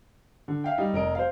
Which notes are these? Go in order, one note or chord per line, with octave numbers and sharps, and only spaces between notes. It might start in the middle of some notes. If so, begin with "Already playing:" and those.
D3
E5 F5 G5
G3 D#4
F1 A#4 D#5 D7
C5 F5